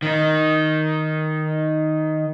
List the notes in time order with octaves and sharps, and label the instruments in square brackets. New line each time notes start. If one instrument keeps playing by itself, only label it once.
[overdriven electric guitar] D#3 D#4